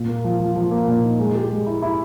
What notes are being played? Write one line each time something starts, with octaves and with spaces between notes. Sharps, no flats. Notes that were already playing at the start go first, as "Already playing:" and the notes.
Already playing: A#2
A#3
F3
F3
F3
A#3
A#2
D#4
G#3
G4
G#3
E4
E4